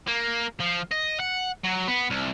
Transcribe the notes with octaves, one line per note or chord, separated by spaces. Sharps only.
A#3
F3
D#5
F#5
F#3
B3
C2